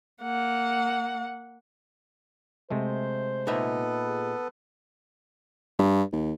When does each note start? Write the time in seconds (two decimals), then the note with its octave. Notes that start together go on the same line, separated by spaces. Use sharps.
0.23 A#3 F#5
2.70 C3 G#3 A3 C5
3.47 A#2 B3 D#4 A4 B4 E5
4.07 G#4
5.79 G2
6.13 D#2